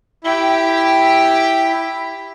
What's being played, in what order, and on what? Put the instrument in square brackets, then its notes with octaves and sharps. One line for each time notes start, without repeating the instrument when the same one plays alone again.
[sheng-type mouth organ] E4 [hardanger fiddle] G4 G5